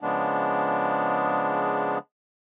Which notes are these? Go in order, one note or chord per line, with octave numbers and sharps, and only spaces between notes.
C#3 F3 G#3 B3 D4